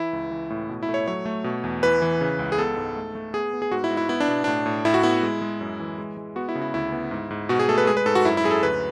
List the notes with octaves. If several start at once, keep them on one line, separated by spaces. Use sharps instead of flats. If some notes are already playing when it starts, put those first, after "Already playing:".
Already playing: E3 E4
C#2
E3
A2
B2
E4
A3
C#5
F#3 C#5
A3
B2
E2
E3 B4
E3
C#3
C#2
G#4
B3 A4
G#2
A3
A3
B3 G#4
B3
G#4
G#2 F#4
E4
G#2
E4
B3 E4
D4
B2
A2 D4
A2
A2 E4
F#4
B3 E4
G#3
G#3
F#2
E3
G#3
G#3
B3 F#4
E4
C#3
E4
D2 E4
B3
G#2
G#2
B2 F#4
G#4
A3 A4
B4
G#3 G#4
B4
G#2 A4
F#4
F#2 E4
E4
F#2 G#4
A4
D2 B4